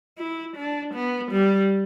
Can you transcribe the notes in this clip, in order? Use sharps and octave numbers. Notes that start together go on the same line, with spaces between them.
E4
D4
B3
G3